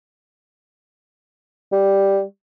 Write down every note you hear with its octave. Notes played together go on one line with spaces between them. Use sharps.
G3